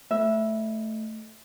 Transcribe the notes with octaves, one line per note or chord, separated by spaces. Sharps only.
A3 E5